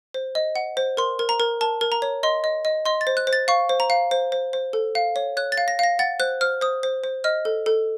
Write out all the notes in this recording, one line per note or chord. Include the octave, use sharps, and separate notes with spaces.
C5
D#5
F#5
C5
A#4 C6
A#4
A#5
A#4
A#4 A5
A#4
A#5
C#5
D#5 C6
D#5
D#5
D#5 C6
A6
C5
F#6
C5
A6
F5 C#6
C5
A#5
F5
C5
C5
C5
A4
F5
C#5
C#5 F#6
A6
F5
A#6
F5 A#6
F#5 A6
C5 F#6
C5 F6
C5 D#6
C5
C5
D#5 F6
A4
A4